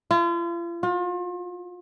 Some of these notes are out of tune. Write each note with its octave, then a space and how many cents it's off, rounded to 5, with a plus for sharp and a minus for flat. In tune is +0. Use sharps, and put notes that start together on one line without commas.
F4 -40
F4 +35